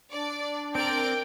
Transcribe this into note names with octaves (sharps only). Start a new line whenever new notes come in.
D4 D5
C4 A#4 D5 G5 D7